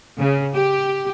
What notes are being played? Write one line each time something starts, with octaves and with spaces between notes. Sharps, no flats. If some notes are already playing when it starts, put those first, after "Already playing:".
C#3
G4